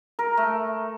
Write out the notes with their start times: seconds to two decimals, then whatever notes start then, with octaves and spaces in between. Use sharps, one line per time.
0.19 A#4
0.37 A3